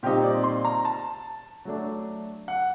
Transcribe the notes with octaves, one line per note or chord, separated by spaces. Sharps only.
A#2 G3 C4 D#4 G4
D5
C6
A#5
A5
F#3 A3 D4
F#5